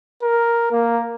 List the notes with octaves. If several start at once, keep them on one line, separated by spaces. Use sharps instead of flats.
A#4
A#3